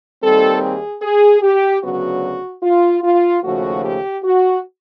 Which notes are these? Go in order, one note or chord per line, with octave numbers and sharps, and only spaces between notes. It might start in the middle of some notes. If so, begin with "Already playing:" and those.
D#2 D#3 G3 C4 A4
G#4
G#4
G4
D2 C#3 F#3 B3 F#4
F4
F4
D#2 C#3 F3 A3 F#4
G4
F#4